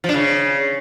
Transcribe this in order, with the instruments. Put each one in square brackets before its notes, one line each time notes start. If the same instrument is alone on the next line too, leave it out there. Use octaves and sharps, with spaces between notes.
[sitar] F3
D4
C#3